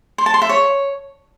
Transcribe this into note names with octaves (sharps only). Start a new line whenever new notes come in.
C6
A5
C6
E5
C#5